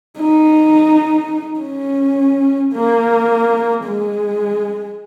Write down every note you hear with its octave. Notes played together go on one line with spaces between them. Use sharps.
D#4
C#4
A#3
G#3